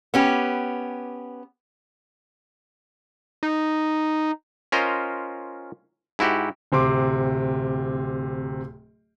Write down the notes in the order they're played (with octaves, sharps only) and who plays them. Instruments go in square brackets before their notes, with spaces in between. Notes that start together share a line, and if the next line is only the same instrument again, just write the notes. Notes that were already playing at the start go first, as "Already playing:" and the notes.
[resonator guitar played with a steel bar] B3 C#4 G4
[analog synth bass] D#4
[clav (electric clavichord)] C#4 F4 A#4 C5 D#5
G#2 E4 F#4 G4
[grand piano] D1 C3 C6 D6